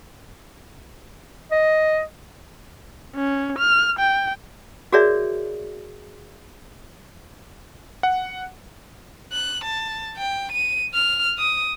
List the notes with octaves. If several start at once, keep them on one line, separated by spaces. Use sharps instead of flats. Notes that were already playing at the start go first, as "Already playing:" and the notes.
D#5
C#4
F6
G5
F#4 G#4 A#4 C#5 D5 E5
F#5
F#6
A5
G5
D#7
F6
D#6